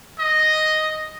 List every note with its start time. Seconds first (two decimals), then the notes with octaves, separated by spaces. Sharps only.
0.19 D#5